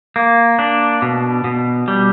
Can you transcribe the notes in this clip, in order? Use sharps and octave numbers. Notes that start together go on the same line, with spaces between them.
A#3
D4
B2
B2
G3